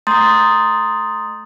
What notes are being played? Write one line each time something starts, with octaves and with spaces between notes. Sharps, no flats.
A3 A#5 C6 D#6 G6 A6